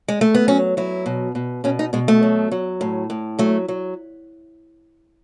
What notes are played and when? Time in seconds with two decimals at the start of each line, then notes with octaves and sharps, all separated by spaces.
0.08 G#3
0.21 A3
0.35 B3
0.48 F#3 C#4
0.77 F#3 E4
1.06 B2
1.35 B2
1.64 B2 C#4
1.79 D#4
1.93 B2 G#3
2.08 A3
2.23 F#3
2.51 F#3
2.81 A2
3.10 A2
3.39 F#3 A3
3.68 F#3